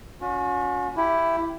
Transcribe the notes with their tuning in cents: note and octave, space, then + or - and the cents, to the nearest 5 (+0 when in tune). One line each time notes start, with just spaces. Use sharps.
C#4 +25 F#4 -40
E4 +10 G4 +0